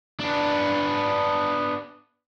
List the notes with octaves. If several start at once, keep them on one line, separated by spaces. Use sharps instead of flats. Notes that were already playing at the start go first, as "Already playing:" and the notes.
B3 D4